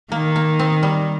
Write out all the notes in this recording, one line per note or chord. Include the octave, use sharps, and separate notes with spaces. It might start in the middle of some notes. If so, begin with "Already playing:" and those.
D#3 A#3
A#3
C4
G3